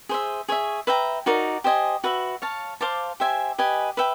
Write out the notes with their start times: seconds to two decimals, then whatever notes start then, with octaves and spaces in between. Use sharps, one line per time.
0.09 G#4 C5 E5
0.48 G#4 C#5 E5
0.87 B4 E5 G5 A#5
1.26 D#4 F#4 A#4 D5
1.64 G4 C5 D#5 G#5
2.04 F#4 B4 E5
2.42 C#5 F5 A5
2.81 C5 F5 A5 D6
3.20 G4 C5 E5 G#5
3.58 G4 B4 D#5 G#5
3.97 B4 E5 G5